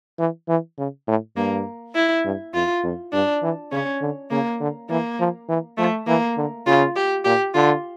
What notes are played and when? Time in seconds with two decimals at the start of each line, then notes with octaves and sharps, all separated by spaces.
0.19 E3
0.48 E3
0.78 C#3
1.07 A2
1.36 G2 A#3
1.95 E4
2.25 G2
2.54 F2 F4
2.83 F2
3.13 G2 D4
3.42 E3
3.72 C#3 C#4
4.01 D3
4.31 C#3 A#3
4.60 D3
4.90 E3 A#3
5.20 F3
5.49 E3
5.78 F3 A3
6.07 E3 A#3
6.37 D3
6.66 C#3 F4
6.96 G4
7.25 A#2 G4
7.54 D3 F4